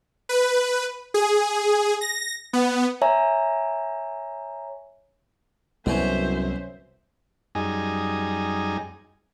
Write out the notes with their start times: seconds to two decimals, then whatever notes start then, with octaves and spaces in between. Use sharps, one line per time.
0.29 B4
1.14 G#4
2.01 A#6
2.53 B3
3.02 C#5 E5 G#5 A#5
5.86 C2 F#2 B2 E3 C#4 C5 E5
7.55 F#2 G3 D#4 G#4 G#5 A#5